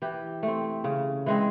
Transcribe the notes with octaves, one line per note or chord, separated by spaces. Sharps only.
E3 G4
A3
C4
C#3
E3 G#3 C4